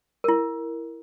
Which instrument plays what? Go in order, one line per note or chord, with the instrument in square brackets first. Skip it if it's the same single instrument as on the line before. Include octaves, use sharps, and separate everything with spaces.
[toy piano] E4 A#4